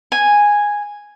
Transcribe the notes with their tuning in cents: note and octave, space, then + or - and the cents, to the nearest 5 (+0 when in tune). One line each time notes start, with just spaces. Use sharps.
G#5 -5